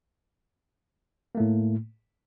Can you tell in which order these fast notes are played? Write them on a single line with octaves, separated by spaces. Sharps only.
A#3 A3 A2